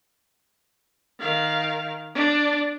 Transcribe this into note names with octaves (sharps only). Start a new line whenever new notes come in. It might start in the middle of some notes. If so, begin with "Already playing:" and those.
D#3 F5
D4